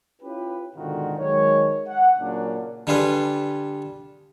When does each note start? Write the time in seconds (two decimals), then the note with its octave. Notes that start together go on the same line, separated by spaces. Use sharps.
0.22 C#4 E4 F4 G4 B4
0.76 G#2 B2 D3 D#3 F4 F#4
1.18 D#3 F#3 G#3 C#5
1.88 F#5
2.19 A#2 C#3 F#3 A#3 C#4 D4
2.87 D3 G3 F4 G#4 B4